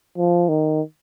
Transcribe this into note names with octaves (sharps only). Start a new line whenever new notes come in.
F3
D#3